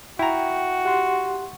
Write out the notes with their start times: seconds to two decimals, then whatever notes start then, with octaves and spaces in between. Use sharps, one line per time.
0.19 E4 F#4 G5 A#5
0.85 G4 F#5 C6